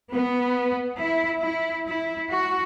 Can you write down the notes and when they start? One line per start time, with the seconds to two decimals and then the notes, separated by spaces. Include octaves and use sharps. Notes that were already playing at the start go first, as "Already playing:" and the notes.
0.12 B3
1.00 E4
1.43 E4
1.88 E4
2.32 F#4